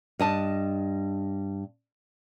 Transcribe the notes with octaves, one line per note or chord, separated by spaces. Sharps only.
G2 D#5 A5